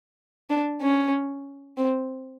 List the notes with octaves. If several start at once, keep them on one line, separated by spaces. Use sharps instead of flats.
D4
C#4
C4